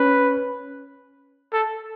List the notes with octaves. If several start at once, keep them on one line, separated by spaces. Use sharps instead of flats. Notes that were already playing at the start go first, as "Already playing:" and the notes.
Already playing: C#4 B4
A4